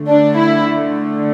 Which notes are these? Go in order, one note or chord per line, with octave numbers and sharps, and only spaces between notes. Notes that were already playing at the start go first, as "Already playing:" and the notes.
Already playing: D3 A3
D4
E4